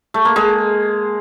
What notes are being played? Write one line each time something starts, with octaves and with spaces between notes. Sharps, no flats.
A3
A#3
G#3